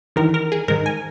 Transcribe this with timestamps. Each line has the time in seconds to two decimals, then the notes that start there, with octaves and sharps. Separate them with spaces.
0.16 E2 D#3 A#4
0.34 A#4
0.52 G#4
0.68 G#2 D#3 A#4
0.86 G#5